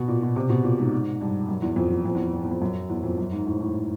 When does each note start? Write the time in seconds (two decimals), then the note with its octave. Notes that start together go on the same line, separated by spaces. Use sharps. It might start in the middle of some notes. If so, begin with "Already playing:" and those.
Already playing: B2
0.08 A#2
0.22 B2
0.36 C3
0.49 B2
0.64 A#2
0.78 G#2
1.21 G2
1.49 F#2
1.62 E2
1.76 F2
1.91 E2
2.06 F2
2.15 E2
2.33 E2
2.43 E2
2.51 F2
2.62 F#2
2.90 E2
3.03 F2
3.18 F#2
3.32 G#2
3.47 A2
3.60 A2